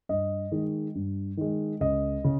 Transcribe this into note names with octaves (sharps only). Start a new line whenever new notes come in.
G2 D#5
D#3 G#3
G2
D#3 G#3
C#2 D#5
C#3